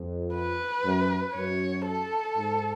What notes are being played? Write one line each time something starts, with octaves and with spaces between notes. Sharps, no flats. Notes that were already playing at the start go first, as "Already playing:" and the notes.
Already playing: F2
B4
F#2
F#2 C#5
A4
G#2